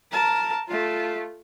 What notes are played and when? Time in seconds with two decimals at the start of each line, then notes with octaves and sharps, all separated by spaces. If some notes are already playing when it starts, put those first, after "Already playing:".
0.12 A#4 A5
0.68 A3 F4